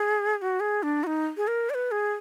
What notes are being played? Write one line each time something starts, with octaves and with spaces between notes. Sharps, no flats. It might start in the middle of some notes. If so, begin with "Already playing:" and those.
Already playing: G#4
G#4
F#4
G#4
D4
F#4
D#4
G#4
A#4
D5
B4
G#4